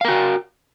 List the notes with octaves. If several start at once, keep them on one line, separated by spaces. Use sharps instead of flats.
F#4 A#4 F5